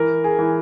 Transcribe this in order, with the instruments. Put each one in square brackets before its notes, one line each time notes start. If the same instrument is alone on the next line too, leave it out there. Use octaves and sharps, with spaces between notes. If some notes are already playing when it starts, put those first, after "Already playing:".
Already playing: [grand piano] E3 A#4
G#4
E3